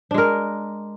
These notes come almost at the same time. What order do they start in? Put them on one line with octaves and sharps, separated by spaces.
D4 G#3 A#4